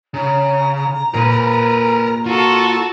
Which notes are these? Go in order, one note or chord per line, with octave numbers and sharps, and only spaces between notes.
C#3 A#5
A#2 A#4 B4
F4 F#4 A4